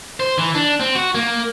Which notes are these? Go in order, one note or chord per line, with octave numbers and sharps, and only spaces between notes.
C5
E3
D4
C4
F#4
A#3